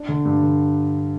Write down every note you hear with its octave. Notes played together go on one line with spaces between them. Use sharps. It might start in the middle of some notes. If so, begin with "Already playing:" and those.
Already playing: D4
D3
G2
D3